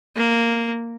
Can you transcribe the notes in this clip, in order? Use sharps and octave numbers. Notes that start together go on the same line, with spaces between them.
A#3